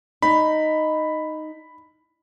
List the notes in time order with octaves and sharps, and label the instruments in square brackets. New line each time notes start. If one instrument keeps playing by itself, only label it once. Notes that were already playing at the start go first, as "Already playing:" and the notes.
[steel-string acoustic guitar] D#4 [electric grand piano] B5